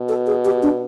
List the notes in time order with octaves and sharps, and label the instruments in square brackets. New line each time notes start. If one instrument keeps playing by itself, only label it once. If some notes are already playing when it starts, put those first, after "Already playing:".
Already playing: [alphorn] B2
[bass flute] A4
G#4
G4
D4